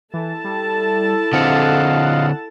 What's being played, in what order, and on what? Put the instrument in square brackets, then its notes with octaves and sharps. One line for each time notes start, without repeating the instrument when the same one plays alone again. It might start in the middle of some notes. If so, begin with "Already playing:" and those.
[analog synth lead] E3 [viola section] E4 A4 A5
[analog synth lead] G3
[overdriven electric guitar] D3 C4 [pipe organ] F4 D#5 F5 [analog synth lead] F#5